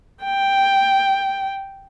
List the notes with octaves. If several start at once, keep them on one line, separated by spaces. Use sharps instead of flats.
G5